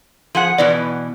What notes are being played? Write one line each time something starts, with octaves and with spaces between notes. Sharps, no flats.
F3 G#4 F#5
B2 E3 B3 D5